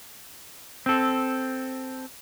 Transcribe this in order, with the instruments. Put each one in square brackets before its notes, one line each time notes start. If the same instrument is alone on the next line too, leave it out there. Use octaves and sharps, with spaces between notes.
[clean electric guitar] C4 A4